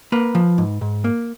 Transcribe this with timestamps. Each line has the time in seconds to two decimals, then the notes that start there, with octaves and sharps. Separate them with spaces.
0.12 A#3 B4
0.35 F3
0.58 G#2
0.81 G#2
1.04 A#3